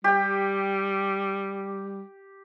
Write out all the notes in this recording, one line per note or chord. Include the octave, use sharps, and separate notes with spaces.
G3 G4 G5